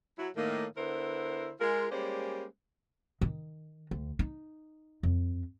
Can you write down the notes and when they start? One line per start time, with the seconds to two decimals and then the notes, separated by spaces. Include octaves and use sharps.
0.18 F#3 E4
0.36 A2 D#3 A#3
0.77 D3 B3 E4 A#4 C5
1.60 G#3 F4 A#4
1.91 G3 G#3 A#3 C#4 C5 D5
3.21 D#3
3.91 D2
4.19 D#4
5.03 F2